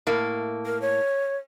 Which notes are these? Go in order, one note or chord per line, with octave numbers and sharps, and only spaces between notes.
A2 A#3
A#4
C#5